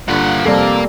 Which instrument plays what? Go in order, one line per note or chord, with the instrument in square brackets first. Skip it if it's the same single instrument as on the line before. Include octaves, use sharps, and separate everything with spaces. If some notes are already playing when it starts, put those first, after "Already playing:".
[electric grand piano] G2 D3 F4 [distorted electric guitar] A#3 F#5
[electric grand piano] F2 C3 D5 [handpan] G3 A4 [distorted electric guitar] A#3